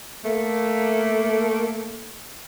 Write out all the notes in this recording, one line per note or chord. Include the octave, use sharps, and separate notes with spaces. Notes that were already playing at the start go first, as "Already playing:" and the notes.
A3 A#3